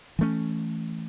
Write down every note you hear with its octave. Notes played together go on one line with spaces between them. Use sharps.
E3 A3 C#4